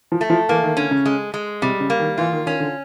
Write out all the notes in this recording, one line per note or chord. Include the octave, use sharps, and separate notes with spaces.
F3
A3
F3
E3 A#3
D#3
D3 C#4
C#3
G#3
G#3
C3 G3
C#3
A#3
D#3
E3 F4
D#3
D#3 C#4
D3